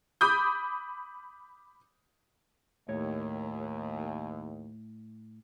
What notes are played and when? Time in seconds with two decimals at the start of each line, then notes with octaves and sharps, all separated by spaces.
0.21 B5 D6 D#6 G6
2.89 D#2 A2 C#5